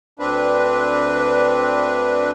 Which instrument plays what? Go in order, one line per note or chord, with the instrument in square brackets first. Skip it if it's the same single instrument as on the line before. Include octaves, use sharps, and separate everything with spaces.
[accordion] D2 C4 D4 B4